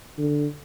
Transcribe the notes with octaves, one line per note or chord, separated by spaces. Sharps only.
D3